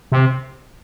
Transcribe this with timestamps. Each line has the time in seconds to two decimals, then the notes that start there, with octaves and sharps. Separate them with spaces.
0.12 C3